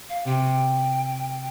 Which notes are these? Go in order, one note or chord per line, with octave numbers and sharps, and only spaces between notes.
F5
C3 G5